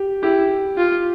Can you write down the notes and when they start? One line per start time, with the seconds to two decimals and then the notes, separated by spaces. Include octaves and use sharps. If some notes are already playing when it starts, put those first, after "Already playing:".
Already playing: G4
0.23 E4 G4
0.77 F4